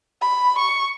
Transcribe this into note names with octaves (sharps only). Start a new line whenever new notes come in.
B5
C#6